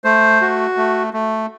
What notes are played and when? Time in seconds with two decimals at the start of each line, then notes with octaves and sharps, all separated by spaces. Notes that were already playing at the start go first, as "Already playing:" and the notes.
0.04 A3 C5
0.41 F#4
0.77 A3
1.14 A3